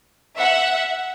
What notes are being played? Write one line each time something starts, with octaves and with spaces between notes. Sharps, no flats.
E5 F#5